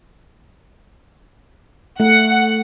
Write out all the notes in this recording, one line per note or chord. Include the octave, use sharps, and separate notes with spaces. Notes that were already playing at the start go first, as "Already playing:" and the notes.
A3 F#5